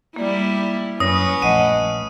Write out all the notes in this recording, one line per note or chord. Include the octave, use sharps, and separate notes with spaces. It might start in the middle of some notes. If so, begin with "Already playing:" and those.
G3 A#3 E4 D5
F#2 C#4 B4 C#5 D#6 A#6
A#1 A3 D#5 F#5 D#7